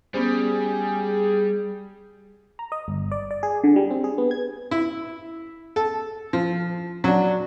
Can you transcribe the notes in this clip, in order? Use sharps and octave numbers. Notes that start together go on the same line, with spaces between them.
G3 B3 C#4 G#4 C5
A#5
D#5
G1
D5
D5
G#4
D3
G3
C4
G#4
B3
G#6
E4
A4
F3
F#3 D4